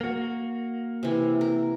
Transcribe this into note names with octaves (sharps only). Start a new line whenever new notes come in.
A#3 F#4
C3 E3
A#4